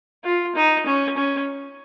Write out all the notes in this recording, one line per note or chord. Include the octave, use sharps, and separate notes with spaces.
F4
D#4
C#4
C#4